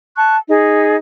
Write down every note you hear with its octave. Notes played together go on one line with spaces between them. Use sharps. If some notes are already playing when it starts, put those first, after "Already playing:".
A5 C#6 F#6
D#4 G#4